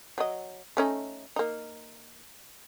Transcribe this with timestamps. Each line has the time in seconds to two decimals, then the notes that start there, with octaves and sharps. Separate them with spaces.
0.18 F#3 D#5
0.77 A3 C#4 D#4
1.36 A#3 D#4